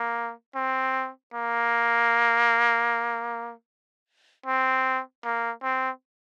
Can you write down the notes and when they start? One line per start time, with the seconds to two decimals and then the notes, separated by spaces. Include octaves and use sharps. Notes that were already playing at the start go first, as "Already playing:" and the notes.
Already playing: A#3
0.56 C4
1.34 A#3
4.46 C4
5.24 A#3
5.63 C4